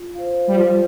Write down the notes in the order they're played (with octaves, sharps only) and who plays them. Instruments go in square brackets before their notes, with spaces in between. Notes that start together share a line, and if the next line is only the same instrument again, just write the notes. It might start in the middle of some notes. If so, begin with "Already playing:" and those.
Already playing: [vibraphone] F4
C5 F5
[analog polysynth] G3
[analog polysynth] F3 [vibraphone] F4